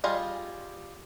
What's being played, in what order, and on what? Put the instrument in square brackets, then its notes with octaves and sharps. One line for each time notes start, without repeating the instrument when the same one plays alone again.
[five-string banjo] G3 F4 G#4 D#5